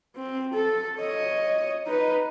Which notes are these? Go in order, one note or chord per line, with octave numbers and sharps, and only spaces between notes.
C4
A4
C#5 D#5
D#4 B4